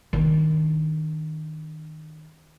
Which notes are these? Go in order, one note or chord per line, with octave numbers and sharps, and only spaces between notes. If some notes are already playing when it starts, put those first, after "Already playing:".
D#3 D4